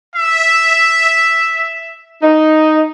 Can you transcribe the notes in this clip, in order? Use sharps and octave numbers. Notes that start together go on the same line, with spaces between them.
E5
D#4